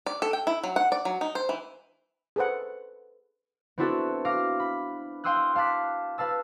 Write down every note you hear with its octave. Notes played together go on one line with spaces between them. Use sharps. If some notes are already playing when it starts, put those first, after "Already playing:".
D5
A4
G5
E4
F#3
F#5
D5
F#3
D#4
C5
E3
G#4 A4 B4 C5 F#5
B3 C4 D4 E4 F#4 A4
F5 D6 F6 A#6
B5
F5 G5 C6 D#6 E6 F#6
F5 A5 D6 F#6 B6
B4 F5 A5 E6